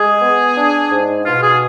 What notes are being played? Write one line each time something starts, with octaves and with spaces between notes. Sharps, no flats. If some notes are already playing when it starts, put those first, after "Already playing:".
Already playing: G#3 G#4
B3
D4
G#2
B2 F4
G#4